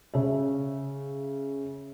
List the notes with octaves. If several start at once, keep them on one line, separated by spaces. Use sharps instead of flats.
C#3 E5